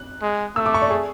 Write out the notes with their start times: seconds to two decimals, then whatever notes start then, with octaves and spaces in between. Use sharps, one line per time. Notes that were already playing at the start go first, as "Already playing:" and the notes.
Already playing: F#6
0.22 G#3
0.56 A3 E6
0.66 D6
0.74 C#6
0.82 D5
0.90 G#4